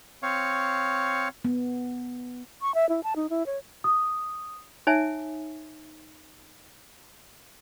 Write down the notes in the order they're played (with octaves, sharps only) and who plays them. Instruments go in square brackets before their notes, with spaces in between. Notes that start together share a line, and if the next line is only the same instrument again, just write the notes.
[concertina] C4 C#5 F5 C#6
[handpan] B3
[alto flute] C#6
E5
E4
A5
D#4
E4
C#5
[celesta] D#6
[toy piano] D#4 C#5 E5 G#5